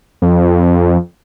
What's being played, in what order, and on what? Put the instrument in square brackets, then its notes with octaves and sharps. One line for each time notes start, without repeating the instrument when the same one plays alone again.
[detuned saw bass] F2